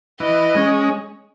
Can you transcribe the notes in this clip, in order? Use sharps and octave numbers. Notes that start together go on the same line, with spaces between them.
E3 D#5
G#3 C#4